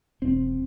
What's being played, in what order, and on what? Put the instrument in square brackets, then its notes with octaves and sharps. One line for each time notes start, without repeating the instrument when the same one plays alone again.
[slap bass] E1 C4